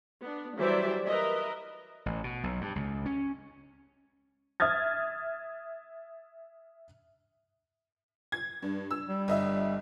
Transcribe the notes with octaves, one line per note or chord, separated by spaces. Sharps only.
B3 D4
E3 F#3 G3 C5 D5 E5
A#4 B4 D#5 E5
A1
B2
B1
G2
C#2
C#4
E5 D#6 F6 G#6 A6
G#6
G2
E6
G3
G1 D#5 E5